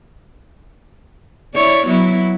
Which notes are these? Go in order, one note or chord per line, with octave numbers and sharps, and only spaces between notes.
E4 C#5 D5
F#3 B3 E4